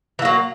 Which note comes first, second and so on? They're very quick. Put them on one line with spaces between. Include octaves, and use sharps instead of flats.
E3 A#3 F#3